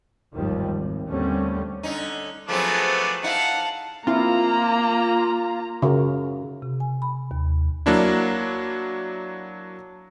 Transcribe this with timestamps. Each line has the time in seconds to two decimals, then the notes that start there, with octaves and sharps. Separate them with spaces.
0.34 G1 D#2 G#2 D#3 F3 G3
0.76 G#1
1.07 D#2 D3 G3 A3 C4 C#4
1.83 D3 C#4 D#4
2.49 F3 F#3 A3 B3 C4 D4 G#4
3.23 D#4 E4 F5 F#5 A5
4.07 A#3 C4 E4 F4 A#5
5.82 C#3 F#4 A#4
6.62 C3
6.80 G#5
7.02 B5
7.31 D#2
7.86 F#3 A#3 D4 E4